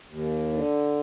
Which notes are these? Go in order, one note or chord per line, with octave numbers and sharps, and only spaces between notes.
D#2
D3